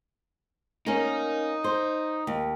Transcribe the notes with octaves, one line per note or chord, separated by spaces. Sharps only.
A#3 C#4 D#4
C5
D#2